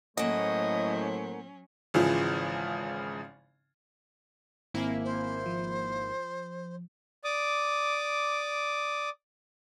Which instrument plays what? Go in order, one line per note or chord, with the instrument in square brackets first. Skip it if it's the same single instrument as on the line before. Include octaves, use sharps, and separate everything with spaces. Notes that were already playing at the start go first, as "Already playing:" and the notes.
[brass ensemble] A2 A3 C5 [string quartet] F#3 C#4 [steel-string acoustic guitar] A#3 F#5 [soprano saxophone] D#5
[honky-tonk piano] G#1 C#3 E3 F3
[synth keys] G#1 A#3 E4 [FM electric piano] C4 G#5
[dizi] C5
[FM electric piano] F3
[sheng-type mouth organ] D5 D6 D#6